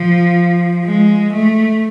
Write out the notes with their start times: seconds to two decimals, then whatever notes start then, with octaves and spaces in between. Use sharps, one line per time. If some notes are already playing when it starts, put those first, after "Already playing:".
Already playing: F3
0.85 G#3
1.33 A3